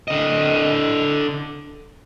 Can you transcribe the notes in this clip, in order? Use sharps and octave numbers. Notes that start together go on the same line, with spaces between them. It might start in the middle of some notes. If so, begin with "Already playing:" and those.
D3 D#5